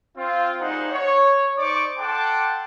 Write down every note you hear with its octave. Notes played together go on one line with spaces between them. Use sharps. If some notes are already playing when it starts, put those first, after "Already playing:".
C4 F4
G3 A#3 D#4 G#4 C5 F#5
C#5
D#4 C5 D5 C#6 D6
A4 F#5 G5 A5 C6 D6